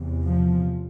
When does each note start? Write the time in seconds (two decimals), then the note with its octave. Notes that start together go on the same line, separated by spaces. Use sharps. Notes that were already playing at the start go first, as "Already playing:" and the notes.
Already playing: E2 C3
0.24 F3